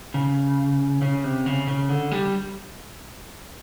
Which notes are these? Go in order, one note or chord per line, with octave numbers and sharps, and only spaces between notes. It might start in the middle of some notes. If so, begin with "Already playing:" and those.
C#3
C#3
C3
C#3
C#3
D3
G3